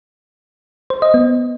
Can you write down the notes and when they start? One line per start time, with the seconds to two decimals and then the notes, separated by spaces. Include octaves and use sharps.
0.90 C5
1.02 D#5
1.14 B3